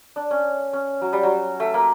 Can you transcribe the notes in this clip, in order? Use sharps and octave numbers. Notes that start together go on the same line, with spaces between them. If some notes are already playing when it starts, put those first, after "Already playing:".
D4
C#4
C#4
F#3
G3
F#3
A3
A#3